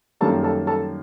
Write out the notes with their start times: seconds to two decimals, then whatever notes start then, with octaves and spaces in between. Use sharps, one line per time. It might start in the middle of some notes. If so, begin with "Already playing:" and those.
0.21 F#2 D#3 G3 A#3 A4 A5
0.43 A4 A5
0.67 A4 A5